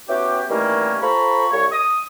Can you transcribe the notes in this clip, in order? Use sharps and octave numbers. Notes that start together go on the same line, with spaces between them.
B3 C#4 E4 F#4 G4
D#3 E3 G3 A3 A#3 C#4
F4 A4 C5 A#5 B5 C#6
C2 C#5
D#6